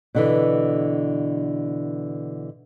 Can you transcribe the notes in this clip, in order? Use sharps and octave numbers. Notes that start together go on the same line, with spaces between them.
B2 D3 E3